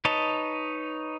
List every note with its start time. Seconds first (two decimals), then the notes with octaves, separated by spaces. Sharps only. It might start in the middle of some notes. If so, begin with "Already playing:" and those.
0.05 D#4 B4 C#5 D#5 A5